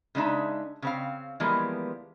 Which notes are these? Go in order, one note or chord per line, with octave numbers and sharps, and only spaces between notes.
C#3 G#3 D4 D#4 E5
C#3 C4 F5
E3 F3 G3 G#3 A#3 B3